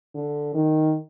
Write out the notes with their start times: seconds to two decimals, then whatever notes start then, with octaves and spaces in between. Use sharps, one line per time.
0.15 D3
0.54 D#3